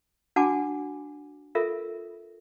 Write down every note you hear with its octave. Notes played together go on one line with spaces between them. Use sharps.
D4 F#4 F#5 G#5 A5 D6
F4 A4 A#4 E5